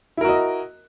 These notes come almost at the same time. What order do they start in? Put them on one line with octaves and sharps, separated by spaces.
E4 A#4 F#4 D#5